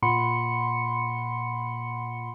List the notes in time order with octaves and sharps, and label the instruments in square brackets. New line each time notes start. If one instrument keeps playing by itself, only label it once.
[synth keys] A#2 F#5 B5 C6 C#7